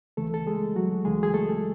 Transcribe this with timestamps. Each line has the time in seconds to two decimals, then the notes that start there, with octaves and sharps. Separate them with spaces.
0.17 C#2 C#3 E3 A3 A4
0.34 A4
0.47 G#3 G#4
0.76 F#3 F#4
1.05 C#2 C#3 E3 G#3 G#4
1.23 G#4
1.34 A3 A4